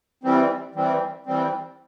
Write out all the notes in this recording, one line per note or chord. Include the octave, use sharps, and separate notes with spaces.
E3 G3 C4
E3 G3 C4
E3 G3 C4